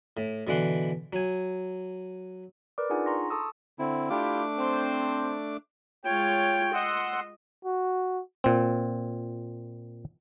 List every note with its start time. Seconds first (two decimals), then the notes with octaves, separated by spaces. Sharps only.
0.17 A2
0.47 B2 D3 E3 F#5 C6
1.13 F#3 G#5
2.78 A#4 B4 D5 D6
2.90 D4 D#4 F4 G#4 F#5 G#5
3.06 A#5 C6 C#6 A#6
3.30 A4 A5 C#6 D#6 E6
3.79 D3 C4 E4
4.10 A3 D4 E4 F4 G4 D6
4.58 C4 C5
6.05 G#3 F4 C#5 G5
6.74 D#5 F#5 C6 E6
7.65 F#4
8.44 A#2 C4